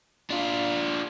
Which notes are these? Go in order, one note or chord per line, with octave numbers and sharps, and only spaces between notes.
D4 F4